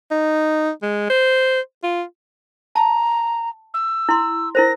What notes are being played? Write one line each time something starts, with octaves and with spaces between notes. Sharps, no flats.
D#4
G#3
C5
F4
A5 A#5
E6
E4 C6
E4 A#4 C5 A#6